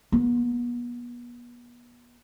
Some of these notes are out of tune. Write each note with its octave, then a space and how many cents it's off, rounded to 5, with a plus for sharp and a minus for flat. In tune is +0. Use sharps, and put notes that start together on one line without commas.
B3 -35